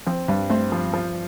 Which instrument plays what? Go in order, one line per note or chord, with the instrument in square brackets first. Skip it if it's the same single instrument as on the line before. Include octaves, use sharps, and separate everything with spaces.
[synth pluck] F3 [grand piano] C4
[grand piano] G2 [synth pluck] G3
[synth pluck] A3 [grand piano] C4
[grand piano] F3
F3